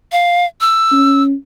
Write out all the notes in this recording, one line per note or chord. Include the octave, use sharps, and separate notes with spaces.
F5
E6
C#4